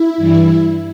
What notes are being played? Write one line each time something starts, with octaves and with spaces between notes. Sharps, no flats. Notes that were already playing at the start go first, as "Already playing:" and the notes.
Already playing: E4
G2 E3 G3